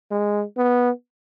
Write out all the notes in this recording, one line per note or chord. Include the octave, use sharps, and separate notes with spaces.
G#3
B3